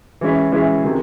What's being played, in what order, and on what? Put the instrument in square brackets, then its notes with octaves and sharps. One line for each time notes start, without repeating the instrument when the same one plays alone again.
[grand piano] E3 G#3 C#4 E4
E3 G#3 C#4 E4
C3 D#3 G#3